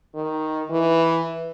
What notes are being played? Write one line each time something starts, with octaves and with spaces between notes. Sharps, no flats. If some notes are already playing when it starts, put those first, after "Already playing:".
D#3
E3